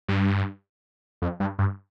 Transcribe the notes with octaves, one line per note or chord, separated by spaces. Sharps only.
G2
F2
G2
G2